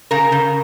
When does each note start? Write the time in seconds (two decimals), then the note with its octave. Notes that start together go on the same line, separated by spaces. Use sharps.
0.11 C#3 A#4
0.32 C#3